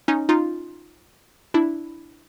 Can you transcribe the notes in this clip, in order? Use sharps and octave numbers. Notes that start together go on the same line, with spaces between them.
C#4 D#4
D#4 F4
D4 E4